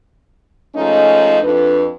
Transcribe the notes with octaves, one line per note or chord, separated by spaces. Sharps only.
F3 G#3 A3 C#4 D#4
F2 D4 B4